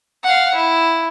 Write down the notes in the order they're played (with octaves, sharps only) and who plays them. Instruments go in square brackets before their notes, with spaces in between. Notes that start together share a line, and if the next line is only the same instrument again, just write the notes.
[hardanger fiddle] F5 F#5
E4